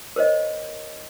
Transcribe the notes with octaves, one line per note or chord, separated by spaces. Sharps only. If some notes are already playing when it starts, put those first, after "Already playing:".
A#4 C5 C#5 D#5